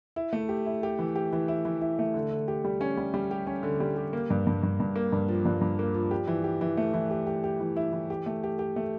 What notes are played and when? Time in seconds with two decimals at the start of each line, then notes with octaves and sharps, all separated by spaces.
0.16 E4
0.33 A3
0.49 G4
0.66 E4
0.83 G4
0.99 E3
1.16 G4
1.33 E3
1.48 E4
1.65 E3
1.81 E4
1.99 A3
2.14 D3
2.31 D3
2.48 G4
2.65 G3
2.81 C#4
2.97 G3
3.14 G3
3.31 G4
3.47 C#4
3.63 D3
3.80 G3
3.96 G4
4.13 A#3
4.30 G2
4.47 G2
4.63 G2
4.80 G2
4.96 A#3
5.12 G2
5.28 F3
5.45 G2
5.61 G2
5.79 A#3
5.94 F3
6.11 G4
6.27 E3
6.44 G4
6.61 E3
6.77 A3
6.94 E3
7.11 G4
7.27 G4
7.44 G4
7.60 E3
7.76 E4
7.93 E3
8.10 G4
8.26 A3
8.44 G4
8.59 G4
8.76 A3